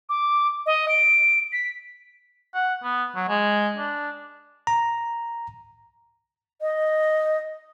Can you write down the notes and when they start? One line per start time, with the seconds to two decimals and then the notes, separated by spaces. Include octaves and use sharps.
0.09 D6
0.66 D#5
0.89 D7
1.53 B6
2.54 F#5
2.83 B3
3.16 F#3
3.29 G#3
3.77 D4
4.67 A#5
6.60 D#5